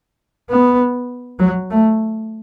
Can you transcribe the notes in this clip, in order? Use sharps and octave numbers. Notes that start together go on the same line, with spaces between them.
B3
F#3
A3